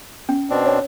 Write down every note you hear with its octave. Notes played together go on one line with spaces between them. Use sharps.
C#4
B2 C4 D4
C#5